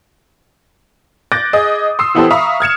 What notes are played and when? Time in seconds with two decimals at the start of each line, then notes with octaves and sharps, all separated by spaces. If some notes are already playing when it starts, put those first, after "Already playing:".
1.32 D6 F#6 G6 A6 A#6 D7
1.53 G#4 D#5 D#6
1.99 C6 D#6 E6 C7
2.15 E3 B3 E4 G4 A4 C5
2.31 E5 F5 A#5 B5 C#6 D#6
2.60 F6 G#6 C#7 E7